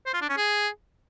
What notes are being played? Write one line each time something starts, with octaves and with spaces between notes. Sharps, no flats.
C5
F4
D4
C#4
G#4